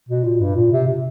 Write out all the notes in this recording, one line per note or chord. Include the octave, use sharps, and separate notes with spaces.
B2
A#2
G2
A#2
C3
C3